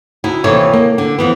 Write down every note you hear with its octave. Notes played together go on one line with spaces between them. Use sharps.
D2 D#4 E4
D#2 C3 E3 A4 C#5
A#3
D3
F2 E3 B3